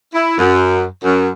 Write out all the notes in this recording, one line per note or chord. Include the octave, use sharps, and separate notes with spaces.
E4
F#2
F#2